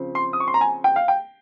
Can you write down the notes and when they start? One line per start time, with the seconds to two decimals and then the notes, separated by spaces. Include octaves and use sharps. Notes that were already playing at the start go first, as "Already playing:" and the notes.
Already playing: C#3 F3 C4
0.15 C6
0.33 D#6
0.40 C#6
0.48 C6
0.54 A#5
0.61 G#5
0.84 G5
0.96 F5
1.08 G5